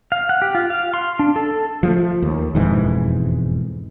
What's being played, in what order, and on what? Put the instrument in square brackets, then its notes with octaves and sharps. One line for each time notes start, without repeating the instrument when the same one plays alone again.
[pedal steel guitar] F5
F#5
G4
F4
F5
C6
D4
A4
[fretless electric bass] F3 G3 A3
D#2
E1 F2 G#2 E3